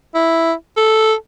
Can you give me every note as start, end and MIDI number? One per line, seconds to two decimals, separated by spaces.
0.15 0.52 64
0.77 1.14 69